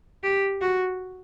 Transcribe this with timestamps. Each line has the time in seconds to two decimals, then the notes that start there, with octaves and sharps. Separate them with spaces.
0.23 G4
0.61 F#4